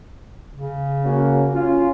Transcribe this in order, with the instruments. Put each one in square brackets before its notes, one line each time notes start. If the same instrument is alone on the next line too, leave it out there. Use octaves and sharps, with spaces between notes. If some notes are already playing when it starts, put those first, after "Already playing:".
[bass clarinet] C#3
[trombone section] A#3 C#4 F#4
C#4 F4